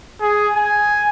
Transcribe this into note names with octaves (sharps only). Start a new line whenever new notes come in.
G#4
G#5